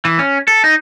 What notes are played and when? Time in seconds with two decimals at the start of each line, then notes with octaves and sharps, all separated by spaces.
0.05 E3
0.19 C#4
0.48 A4
0.64 D#4